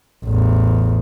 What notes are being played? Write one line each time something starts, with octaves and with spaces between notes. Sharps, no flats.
A1 E2